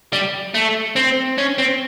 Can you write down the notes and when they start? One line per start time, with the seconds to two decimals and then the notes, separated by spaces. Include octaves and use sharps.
0.13 G3
0.55 A3
0.96 C4
1.38 C#4
1.58 C4